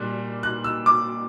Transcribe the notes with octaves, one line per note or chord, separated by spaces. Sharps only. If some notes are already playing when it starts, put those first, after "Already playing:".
Already playing: A#2 G3 A#3 F#6
F#6
E6
D6